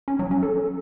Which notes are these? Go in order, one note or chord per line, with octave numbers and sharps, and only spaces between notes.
C#4
F#3
C#4
A4